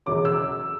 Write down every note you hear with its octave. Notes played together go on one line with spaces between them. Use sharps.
E1 E2 C#3 F#3 C#4 D6
E6